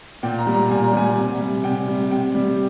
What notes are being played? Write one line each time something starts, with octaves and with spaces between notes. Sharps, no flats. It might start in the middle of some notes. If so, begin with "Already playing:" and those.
A#2 G5
A#5
G3
A#5
A#2 G#5
A#5
G3 G#5
C3
G3
C3 G5
G3
C3 G5
G3